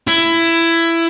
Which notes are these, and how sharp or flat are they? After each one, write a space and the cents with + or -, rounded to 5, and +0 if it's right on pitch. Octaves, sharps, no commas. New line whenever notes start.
E4 +15